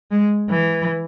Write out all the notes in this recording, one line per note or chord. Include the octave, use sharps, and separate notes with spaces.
G#3
E3